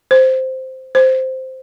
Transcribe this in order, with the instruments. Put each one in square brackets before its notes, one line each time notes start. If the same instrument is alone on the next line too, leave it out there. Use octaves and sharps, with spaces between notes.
[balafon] C5
C5